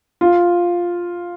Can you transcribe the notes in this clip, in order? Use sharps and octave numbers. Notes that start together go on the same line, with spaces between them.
F4